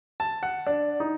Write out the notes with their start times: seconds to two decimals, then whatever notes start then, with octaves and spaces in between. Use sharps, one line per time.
0.20 A5
0.43 F#5
0.66 D4
1.00 D#4